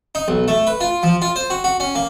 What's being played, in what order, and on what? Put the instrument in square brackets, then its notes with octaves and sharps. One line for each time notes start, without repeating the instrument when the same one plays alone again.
[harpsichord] D#4
B1
A3
B4
F4
F3
F4
C5
F#4
F#4
C#4
A#3